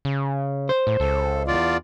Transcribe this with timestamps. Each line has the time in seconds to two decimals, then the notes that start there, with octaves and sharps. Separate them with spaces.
0.05 C#3
0.69 C5
0.87 A2
1.00 C#2 A4
1.47 E2 F4 D5